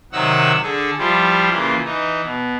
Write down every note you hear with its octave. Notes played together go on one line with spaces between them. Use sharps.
C3 D#3 F#3 D#4 F#5 E6
D3 G#4 A4
F3 G3 E4 F4 G4
C#3 E3 A#3 F4
E3 D#4
B2